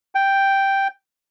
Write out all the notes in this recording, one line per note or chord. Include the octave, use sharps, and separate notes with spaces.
G5